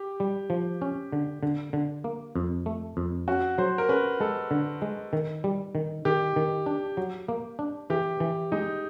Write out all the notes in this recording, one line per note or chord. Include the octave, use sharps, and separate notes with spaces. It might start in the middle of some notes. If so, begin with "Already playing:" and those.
Already playing: G4
G3
F3
C#4
D3
D3
D3
A#3
F2
A3
F2
C#4 F#4
F#3 C5
A#4
C#4 B4
G#3 A4
D3
G#3
D#3
G3
D#3
D#3 G4
D#3
D4
F#3
A#3
D4
E3 G4
E3
G#3 D#4